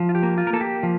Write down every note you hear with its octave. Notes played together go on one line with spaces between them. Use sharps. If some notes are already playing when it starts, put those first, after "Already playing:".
Already playing: F3
F4
G4
A#3
F4
A#4
A#3 A4
G4
F3